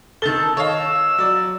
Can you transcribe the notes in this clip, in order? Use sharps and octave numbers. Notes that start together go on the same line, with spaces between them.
D#3 A4 A6 G7
C#5 D#5 F5 E6
F#3 D5